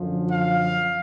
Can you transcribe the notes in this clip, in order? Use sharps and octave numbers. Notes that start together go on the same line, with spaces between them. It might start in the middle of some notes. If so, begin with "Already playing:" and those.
Already playing: F#2 D3 F3
F5